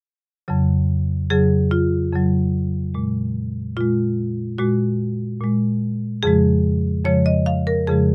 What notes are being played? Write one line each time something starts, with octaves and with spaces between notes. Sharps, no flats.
F2 C#3 F#3
F2 C#3 F#3 G#4
F4
F2 C#3 F#3
A#2 G#3
A#2 G#3 F4
A#2 G#3 F#4
A#2 G#3
F2 C#3 F3 G#3 G#4
F2 C#3 F3 G#3 C#5
D#5
F5
A#4
F2 C#3 F3 G#3 G#4